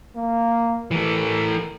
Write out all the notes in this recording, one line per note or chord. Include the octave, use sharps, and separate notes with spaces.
A#3
E3 A3 A#4